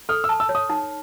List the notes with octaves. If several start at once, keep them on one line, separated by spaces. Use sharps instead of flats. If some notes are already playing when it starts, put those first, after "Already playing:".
A4 F6
E6
A5
E6
C#5
D#6
D#4